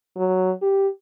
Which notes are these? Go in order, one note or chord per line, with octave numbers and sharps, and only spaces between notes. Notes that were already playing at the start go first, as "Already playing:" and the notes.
F#3
G4